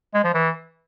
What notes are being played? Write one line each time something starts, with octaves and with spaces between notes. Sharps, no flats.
G#3
F3
E3